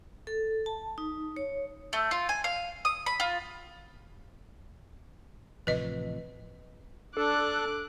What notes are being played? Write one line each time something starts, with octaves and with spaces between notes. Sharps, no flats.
A4
A5
D#4
C#5
A3
F4
G#5
F5
D#6
B5
F4
A1 C3 F3 B4 D#5
D4 A4 D6 F#6